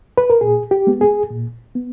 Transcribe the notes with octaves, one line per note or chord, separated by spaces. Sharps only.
B4
A#4
A#2 G#4
G4
G#3 B3
G#4
A#2
B3